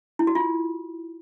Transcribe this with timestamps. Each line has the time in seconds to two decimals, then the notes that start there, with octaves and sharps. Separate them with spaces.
0.19 E4
0.27 F#4
0.35 F4